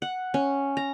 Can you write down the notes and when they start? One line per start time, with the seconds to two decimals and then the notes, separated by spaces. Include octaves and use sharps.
0.02 F#5
0.34 C#4
0.77 A#5